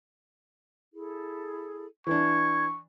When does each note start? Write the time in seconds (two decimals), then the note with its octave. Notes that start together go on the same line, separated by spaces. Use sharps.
0.92 E4 G#4 A4
2.07 E3 D4 C#6 G#6